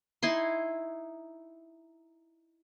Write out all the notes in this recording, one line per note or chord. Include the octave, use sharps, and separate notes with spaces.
D#4 E4 G#5 C6